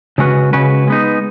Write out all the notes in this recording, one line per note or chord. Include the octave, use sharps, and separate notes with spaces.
C#3 G#3 C#4 F#4 B4
C#3 G#3 C#4 F#4 B4
G#3 B3 D#4